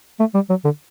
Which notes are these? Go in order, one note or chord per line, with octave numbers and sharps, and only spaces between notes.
A3
G3
F#3
D3